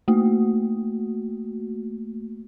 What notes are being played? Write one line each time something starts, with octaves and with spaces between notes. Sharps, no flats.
A3 A#3 F#4